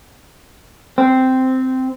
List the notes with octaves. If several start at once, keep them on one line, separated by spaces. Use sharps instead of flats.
C4